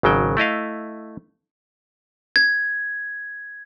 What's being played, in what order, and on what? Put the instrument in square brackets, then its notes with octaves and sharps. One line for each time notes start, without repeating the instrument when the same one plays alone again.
[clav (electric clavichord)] G#1 C#3 F#3 G5
A3 E4 D#5 F5
[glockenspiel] G#6